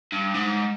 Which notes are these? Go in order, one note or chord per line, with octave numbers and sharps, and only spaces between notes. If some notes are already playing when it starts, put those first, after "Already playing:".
G2
G#2